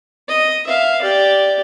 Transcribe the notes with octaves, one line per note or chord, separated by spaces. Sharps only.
D#5
E5 F5
G4 D5